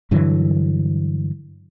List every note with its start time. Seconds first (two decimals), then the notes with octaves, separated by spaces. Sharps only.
0.11 G2 D3 E3 F#3